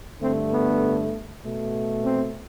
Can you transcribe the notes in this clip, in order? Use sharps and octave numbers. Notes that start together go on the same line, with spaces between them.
G2 D3 A3 C4
B3
B2 A3
C4